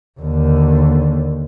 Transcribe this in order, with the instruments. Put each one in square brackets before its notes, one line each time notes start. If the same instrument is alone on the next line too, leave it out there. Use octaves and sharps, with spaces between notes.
[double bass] D#2 D3